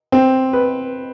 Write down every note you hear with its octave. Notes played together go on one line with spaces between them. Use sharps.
C4
B4